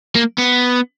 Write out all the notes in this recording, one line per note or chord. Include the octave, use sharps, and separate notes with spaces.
A#3
B3